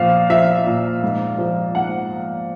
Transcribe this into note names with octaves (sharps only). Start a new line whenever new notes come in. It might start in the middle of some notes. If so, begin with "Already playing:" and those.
Already playing: A#2 F3 F5
F3 E5
A#2
G#2
F3
G#2 F#5